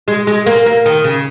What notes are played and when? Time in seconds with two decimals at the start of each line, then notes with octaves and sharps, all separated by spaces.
0.08 G#3
0.27 G#3
0.46 A#3
0.66 A#3
0.86 D#3
1.04 C#3